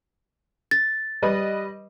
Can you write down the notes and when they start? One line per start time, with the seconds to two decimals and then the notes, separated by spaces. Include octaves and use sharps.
0.71 A6
1.22 G3 B4 D#5